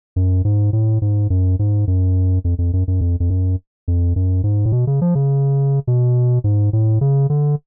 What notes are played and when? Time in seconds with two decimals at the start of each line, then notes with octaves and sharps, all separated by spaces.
0.16 F#2
0.45 G#2
0.73 A2
1.02 G#2
1.30 F#2
1.59 G#2
1.87 F#2
2.44 F2
2.58 F2
2.73 F#2
2.88 F#2
3.01 F2
3.20 F2
3.30 F#2
3.88 F2
4.16 F#2
4.44 G#2
4.66 A2
4.72 B2
4.87 C#3
5.01 F3
5.15 C#3
5.87 B2
6.44 G#2
6.73 A2
7.01 C#3
7.30 D3